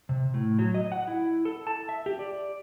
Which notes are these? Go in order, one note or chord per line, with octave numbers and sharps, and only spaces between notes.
C3
A2
F#3
D#5
F#5
E4
A4
A5
E5
G4
D5